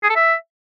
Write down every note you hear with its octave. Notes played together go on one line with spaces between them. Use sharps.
G#4
A4
E5